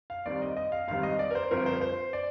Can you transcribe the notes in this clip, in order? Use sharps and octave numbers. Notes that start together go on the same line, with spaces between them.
F5
D#2 D#3 G3 C4 D5
D#5
D#5
F5
G#1 G2 D#3 G3 C4 F5
D#5
D5
A#4
C5
G1 G2 F3 C4 A#4
C5
C5
D5